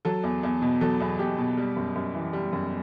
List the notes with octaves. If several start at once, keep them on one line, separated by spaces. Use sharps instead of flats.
F#3 A4
E2
E2
B2
F#3 A4
E2
E2 G4
B2
G3
F#2
F#2
E3
G3
F#2